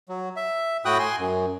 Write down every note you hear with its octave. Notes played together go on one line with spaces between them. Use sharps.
F#3
E5
A2 E4 F#4 G5 D#6 F#6
G#5 C6
F#2